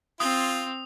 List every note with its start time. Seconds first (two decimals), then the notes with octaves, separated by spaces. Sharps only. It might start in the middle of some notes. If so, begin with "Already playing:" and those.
0.20 C4 F4 D#6